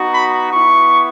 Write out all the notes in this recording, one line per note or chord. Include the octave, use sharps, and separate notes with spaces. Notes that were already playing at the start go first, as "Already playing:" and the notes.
Already playing: B3 D#4 F#4
B5
B3 E4 C#6